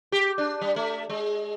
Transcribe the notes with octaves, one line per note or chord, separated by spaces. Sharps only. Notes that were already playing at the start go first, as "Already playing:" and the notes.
G4
D4
G3
A3
G#3